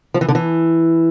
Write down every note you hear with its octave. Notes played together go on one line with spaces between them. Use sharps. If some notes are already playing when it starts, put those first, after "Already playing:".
F3
E3
D3
E3